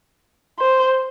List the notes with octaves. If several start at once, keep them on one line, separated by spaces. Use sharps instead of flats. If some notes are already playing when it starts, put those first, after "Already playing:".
C5